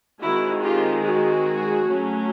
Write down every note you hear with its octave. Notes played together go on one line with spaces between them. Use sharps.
D#3 G#3 C4 E4 F#4
F4 G4
F#4 G#4
F#3 A3 C#4